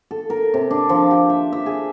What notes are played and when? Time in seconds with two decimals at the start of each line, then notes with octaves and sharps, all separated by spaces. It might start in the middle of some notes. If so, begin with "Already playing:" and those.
0.11 A4
0.30 A#4
0.54 C3
0.70 D4
0.89 F3
1.11 G4
1.30 E5
1.53 E5
1.66 G#4